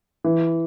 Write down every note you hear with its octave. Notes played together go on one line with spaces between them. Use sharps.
E3